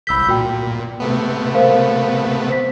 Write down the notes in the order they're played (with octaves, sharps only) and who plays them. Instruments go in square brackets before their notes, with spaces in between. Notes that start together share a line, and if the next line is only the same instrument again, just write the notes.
[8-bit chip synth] C2 G6 [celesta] B5 E6 B6
[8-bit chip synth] A#2 [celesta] F#4 G5
[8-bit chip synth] C3 A3 B3
[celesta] A#4 C5 F5
C5 B6